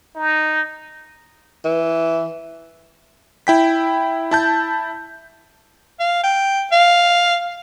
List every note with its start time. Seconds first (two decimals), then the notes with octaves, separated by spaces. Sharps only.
0.15 D#4
1.65 E3
3.47 E4 G5 B6
4.31 E4 A5 G6
6.00 F5
6.24 G5
6.72 F5